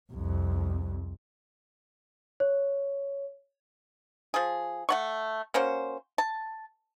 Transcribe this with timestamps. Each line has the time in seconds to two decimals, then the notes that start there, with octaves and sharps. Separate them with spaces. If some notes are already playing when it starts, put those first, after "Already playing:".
0.12 C2 F2
2.40 C#5
4.34 F3 G#4
4.89 A3 F#5 C#6
5.54 A#3 C#4 F#4 C5
6.18 A5